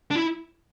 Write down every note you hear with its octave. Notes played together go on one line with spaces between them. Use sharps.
D4
E4